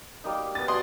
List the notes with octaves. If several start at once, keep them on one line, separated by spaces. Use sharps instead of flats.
G3 A#3 D#4
B3 D#6 A6
F#4 D5 C6 D#6